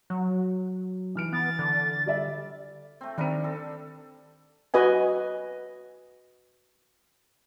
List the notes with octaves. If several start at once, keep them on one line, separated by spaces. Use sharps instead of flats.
F#3
E3 F6 D7
B3 A6
D3
G3 D5 E5
A3 C4
D#3 G3 C4 D4 A#4
A4
F#4 B4 D#5 G#5